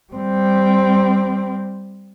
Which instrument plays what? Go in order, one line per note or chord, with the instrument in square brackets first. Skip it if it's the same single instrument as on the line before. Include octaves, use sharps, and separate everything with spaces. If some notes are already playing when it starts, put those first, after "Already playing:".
[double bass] G3 C4